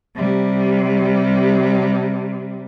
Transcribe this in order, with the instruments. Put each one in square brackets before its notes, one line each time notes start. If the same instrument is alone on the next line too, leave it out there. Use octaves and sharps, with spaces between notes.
[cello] C3 G3